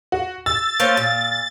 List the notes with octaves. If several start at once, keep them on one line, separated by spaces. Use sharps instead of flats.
F#4
E6 A6
A#3 C#4 C5
A#2